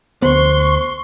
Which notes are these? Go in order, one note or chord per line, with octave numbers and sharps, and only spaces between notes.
D2 B3 C5 C6 C#6